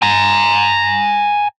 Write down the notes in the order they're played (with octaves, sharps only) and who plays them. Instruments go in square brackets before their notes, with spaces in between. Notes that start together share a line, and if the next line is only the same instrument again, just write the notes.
[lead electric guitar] G#5 A#5